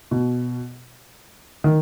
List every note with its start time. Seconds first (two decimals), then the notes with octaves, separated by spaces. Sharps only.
0.11 B2
1.64 D#3